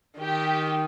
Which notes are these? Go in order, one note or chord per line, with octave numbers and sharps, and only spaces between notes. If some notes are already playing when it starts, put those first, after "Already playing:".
D#3 G4